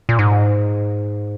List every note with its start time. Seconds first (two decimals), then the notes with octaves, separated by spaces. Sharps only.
0.09 A#2
0.19 G#2